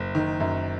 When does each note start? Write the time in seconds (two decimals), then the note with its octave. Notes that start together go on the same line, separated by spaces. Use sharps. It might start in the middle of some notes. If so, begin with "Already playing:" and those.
Already playing: F#1
0.15 D#3
0.40 F#2